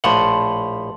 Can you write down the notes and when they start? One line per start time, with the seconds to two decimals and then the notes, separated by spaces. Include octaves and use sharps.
0.04 A#1 A2 F5 F#5 A5 C6